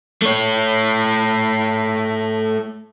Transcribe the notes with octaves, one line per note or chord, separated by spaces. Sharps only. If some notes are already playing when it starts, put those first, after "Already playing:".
A3 C#5